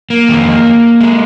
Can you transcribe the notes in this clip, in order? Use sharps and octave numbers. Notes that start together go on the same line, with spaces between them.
A#3
F2 D#3 G#3
G#3